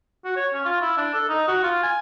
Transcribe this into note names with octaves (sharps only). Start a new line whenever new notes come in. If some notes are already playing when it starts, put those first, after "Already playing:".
F#4
C#5
C#4
F4
E4
D4
A4
D#4
F#4
F4
G#5